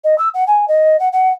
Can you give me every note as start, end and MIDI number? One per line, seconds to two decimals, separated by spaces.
0.04 0.17 75
0.18 0.29 88
0.34 0.44 78
0.47 0.65 80
0.68 0.99 75
0.99 1.09 78
1.12 1.32 78